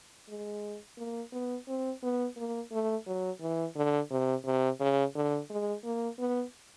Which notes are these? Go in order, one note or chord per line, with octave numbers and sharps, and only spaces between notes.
G#3
A#3
B3
C4
B3
A#3
A3
F#3
E3
D3
C3
C3
C#3
D3
G#3
A#3
B3